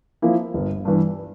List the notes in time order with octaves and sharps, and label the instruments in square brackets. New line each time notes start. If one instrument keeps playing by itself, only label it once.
[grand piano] F3 A#3 E4
G1
G2 E3